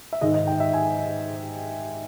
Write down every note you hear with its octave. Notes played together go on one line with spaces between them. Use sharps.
E5
G#2 D#3 G#3 D#5
D#5
G5
E5
G#5